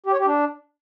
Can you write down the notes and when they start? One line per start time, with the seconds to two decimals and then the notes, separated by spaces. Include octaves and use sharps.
0.06 G4
0.13 C#5
0.19 G4
0.26 D4